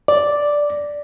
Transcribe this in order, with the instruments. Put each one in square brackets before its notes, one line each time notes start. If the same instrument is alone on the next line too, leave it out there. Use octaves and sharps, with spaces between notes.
[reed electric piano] D5